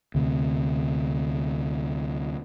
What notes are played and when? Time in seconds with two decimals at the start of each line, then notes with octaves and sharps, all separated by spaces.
0.15 D2 C3